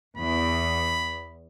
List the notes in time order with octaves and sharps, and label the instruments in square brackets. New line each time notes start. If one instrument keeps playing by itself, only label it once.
[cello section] E2 [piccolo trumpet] B5